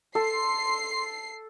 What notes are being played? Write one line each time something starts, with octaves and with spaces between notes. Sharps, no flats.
A4 C6 C7